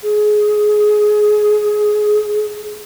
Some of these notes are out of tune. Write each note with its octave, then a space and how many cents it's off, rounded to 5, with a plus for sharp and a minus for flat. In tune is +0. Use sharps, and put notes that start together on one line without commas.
G#4 +15